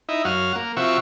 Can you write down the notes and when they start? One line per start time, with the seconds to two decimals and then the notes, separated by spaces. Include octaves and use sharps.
0.09 D#4 E4
0.25 F#2 F#4 F5
0.55 A#3
0.77 C3 F3 F#4 E5 C#6